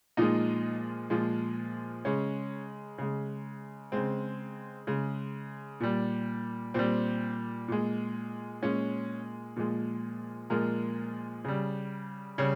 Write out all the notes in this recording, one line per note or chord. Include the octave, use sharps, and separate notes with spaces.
A#2 F3 G#3 D#4
A#2 F3 G#3
C#3 G#3 C#4
C#3 G#3
C#3 G#3 C4
C#3 G#3
A#2 G3
A#2 G3 C4
A#2 G#3
A#2 G#3 C#4
A#2 F3 G#3
A#2 F3 G#3 A#4
C#3 G3
C#3 G3 C#5